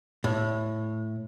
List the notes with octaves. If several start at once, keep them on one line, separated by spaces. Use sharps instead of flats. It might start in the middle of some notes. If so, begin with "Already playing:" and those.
A2